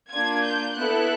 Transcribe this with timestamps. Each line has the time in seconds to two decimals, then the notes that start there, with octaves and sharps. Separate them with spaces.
0.10 A#3 D4 F4 G#6
0.44 G6
0.76 B3 E4 A4 F#6